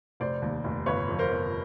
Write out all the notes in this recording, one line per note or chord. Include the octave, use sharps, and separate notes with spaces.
F1 C5 D5
D#2
F1
G1 B4 C#5
F2
A#4 C5
G1